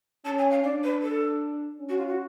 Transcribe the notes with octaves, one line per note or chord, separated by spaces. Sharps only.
C#4 A5
G#5
F5
D4 D5
B4
A4
C#4
F#4
F4
F#4